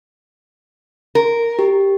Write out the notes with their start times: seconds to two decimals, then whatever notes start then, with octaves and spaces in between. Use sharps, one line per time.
1.15 A#4
1.59 G4